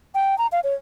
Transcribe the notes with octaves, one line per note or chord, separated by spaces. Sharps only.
G5
A#5
F5
C#5